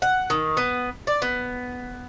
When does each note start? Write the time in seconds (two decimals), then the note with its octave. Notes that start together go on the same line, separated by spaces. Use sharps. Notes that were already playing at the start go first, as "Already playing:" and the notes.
0.02 F#5
0.30 D#3
0.57 B3
1.07 D5
1.22 B3